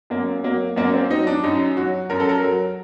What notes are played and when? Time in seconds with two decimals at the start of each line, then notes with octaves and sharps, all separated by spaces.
0.10 F#2 A#3
0.43 F#3 A#3
0.76 F#2 A#3
0.94 C4
1.10 F#3 D#4
1.27 D4
1.43 F#2 D#4
1.77 F#3 F#4
2.10 F#2 A#4
2.20 A4
2.29 A#4
2.44 F#3